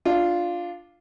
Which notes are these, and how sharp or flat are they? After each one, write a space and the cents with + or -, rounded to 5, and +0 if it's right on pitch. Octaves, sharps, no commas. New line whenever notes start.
D4 +0 F4 +0